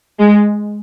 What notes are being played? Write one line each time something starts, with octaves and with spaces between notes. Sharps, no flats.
G#3